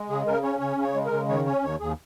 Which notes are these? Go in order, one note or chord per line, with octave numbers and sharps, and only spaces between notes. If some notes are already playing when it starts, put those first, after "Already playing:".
Already playing: G#3
C#3 G#4
C#3 A#4
C#4 C#5
C#3 C#5
C#3
C#5
G#3
A#4
C#3
D#3 C#5
C#4 C#5
D#2 C#5
D#2 G#4